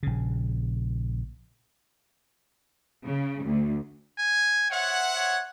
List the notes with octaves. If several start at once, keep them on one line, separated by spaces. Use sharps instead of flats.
A#1 C#3
C#3
D2
G#5
C5 C#5 E5 F#5
C#5